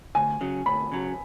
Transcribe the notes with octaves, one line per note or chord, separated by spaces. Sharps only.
D2 G#5
C#3 F#3
D2 B5
C#3 F#3